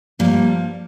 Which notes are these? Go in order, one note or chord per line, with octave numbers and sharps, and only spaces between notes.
G2 F3 G3 A#3